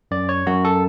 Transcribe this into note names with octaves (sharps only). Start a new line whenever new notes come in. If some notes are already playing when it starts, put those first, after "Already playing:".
F#2 D5
C#5
F#2 F#4
A4